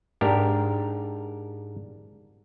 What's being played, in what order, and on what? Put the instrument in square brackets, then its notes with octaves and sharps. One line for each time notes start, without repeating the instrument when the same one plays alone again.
[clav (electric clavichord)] G#2 D4 G4 A#4